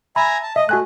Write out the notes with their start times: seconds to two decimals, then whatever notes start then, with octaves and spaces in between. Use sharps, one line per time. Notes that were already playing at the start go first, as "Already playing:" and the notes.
0.16 E5 G#5 A#5 B5
0.43 A5
0.56 D#5 E5
0.69 A3 F#4 G#5 F#6